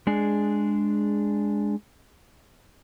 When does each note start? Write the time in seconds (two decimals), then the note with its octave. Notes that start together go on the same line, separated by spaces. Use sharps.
0.07 G#3 D4 G#4